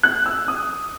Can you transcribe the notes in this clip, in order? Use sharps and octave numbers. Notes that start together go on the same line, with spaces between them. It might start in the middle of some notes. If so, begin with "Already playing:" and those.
F#6
E6
D#6